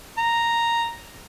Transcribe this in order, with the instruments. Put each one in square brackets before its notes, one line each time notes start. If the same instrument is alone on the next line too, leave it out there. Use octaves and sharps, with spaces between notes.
[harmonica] A#5